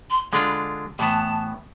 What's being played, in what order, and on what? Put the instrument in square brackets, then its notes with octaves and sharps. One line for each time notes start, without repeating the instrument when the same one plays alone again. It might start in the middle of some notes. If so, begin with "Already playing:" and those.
[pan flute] C6
[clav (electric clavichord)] D3 G#3 D4 F4 [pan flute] B5
[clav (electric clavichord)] A2 E3 B3 [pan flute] A5